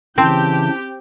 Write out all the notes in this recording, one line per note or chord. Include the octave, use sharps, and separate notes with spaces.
C#3 E3 C4 G4 G5 A5